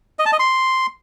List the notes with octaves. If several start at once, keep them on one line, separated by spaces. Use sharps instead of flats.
D#5
A5
D#5
C6